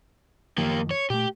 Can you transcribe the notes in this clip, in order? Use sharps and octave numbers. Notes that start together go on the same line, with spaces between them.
F#2 D#3 F3 A#3 G4
C#5
A#2 A3 G4